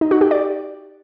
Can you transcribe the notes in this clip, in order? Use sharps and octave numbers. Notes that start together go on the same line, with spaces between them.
D#4
F#4
G4
D5